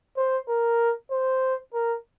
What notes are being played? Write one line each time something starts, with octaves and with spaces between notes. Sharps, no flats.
C5
A#4
C5
A#4